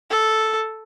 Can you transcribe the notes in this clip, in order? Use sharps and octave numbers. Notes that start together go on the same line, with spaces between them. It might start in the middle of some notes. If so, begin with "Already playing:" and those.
A4